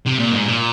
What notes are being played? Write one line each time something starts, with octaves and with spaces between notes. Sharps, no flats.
C3
A#2
G#2
A#2